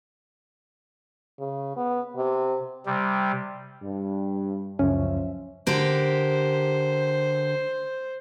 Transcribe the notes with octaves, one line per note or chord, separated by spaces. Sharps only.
C#3
B3
C3
C3 G3
G2
C#2 F#2 F3 C#4 E5
D3 G4 A#4 C5